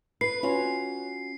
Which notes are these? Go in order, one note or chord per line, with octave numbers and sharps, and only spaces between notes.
B4 C7
C#4 F4 F#4